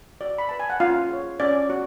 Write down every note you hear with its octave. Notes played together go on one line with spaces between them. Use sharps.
F#4 D5
B5
B4 A5
G#5
F#5
C#4 F4 F5
G#4 C#5
C#4 D5
F#4